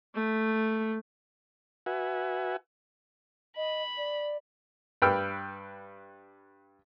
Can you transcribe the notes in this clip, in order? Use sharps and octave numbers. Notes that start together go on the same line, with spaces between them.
A3
F#4 B4 E5 F#5 G#5
D#5 B5
D5
G2 B4 G5 B5 E6 F6